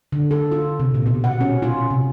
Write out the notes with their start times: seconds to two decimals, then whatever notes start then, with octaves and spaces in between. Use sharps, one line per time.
0.12 D3
0.31 A4
0.52 F4
0.80 C3
0.94 A#2
1.06 B2
1.24 F#5
1.41 C#4
1.62 F4
1.90 C3